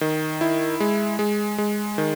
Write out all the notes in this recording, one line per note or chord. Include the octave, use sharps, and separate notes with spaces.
D#3
E4
G#3
G#3
G#3
D#3